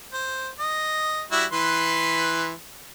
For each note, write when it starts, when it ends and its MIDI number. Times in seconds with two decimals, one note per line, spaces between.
0.12 0.49 72
0.59 1.22 75
1.32 1.45 55
1.32 1.45 64
1.32 1.45 66
1.52 2.52 52
1.52 2.52 71
1.52 2.52 84